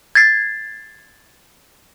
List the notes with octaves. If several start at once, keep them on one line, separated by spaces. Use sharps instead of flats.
G#6 A6 C7